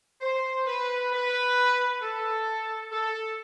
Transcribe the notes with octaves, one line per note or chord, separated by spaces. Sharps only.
C5
B4
B4
A4
A4